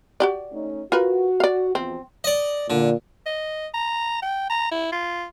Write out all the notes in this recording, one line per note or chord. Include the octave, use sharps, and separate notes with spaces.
F#4 G4 D5
A3 C#4 D#4
F4 F#4 A#4 B4
D5 F5
E2 B2 F3 C4
D5 D#5
A#2 D3
D#5
A#5
G5
A#5
E4
F4